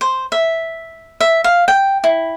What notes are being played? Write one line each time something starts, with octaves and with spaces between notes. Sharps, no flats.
C5
E5
E5
F5
G5
E4